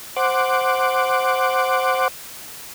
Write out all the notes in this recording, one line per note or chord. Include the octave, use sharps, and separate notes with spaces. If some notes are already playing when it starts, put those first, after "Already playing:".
C5 F#5 D6